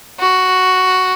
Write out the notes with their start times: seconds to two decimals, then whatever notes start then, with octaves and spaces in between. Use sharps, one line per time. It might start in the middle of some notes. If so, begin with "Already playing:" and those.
0.20 F#4